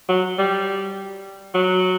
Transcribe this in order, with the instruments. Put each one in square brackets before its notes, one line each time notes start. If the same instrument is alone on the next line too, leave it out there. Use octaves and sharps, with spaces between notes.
[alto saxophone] F#3
G3
F#3